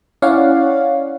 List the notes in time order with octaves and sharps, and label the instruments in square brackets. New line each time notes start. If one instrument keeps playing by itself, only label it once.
[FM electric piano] C#4 E4 C#5 D5 F5 F#5